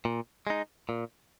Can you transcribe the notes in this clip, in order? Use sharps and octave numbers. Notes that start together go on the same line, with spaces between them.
A#2
G#3 D#4
A#2